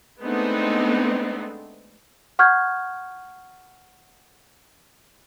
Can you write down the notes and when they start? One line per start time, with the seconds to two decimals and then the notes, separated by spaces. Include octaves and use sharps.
0.21 G#3 A3 B3 C4 D4 D#4
2.39 F#5 C#6 F6 G6 G#6